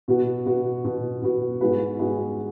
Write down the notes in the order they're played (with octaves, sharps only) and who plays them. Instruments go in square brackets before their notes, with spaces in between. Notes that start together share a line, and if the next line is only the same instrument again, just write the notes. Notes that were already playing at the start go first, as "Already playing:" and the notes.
[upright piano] B2 B3 F#4
B2 B3 F#4
B2 B3 F#4
B2 B3 F#4
G#2 G#3 B3 F#4 B4
G#2 G#3 B3 F#4 B4